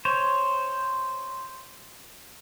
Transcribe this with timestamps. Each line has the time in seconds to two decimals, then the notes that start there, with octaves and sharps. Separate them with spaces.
0.05 C5 C#5